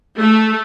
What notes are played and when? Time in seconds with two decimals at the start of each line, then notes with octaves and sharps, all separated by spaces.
0.18 A3